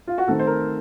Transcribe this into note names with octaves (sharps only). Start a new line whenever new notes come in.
F4
F#4
D#3 A3 C4 A4
C5
A#4